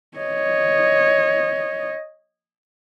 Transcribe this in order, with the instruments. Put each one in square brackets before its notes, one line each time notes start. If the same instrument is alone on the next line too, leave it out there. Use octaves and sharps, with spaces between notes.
[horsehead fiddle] C#5 D#5